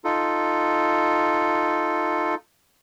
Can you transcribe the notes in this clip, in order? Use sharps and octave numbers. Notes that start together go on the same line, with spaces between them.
D#4 F4 A4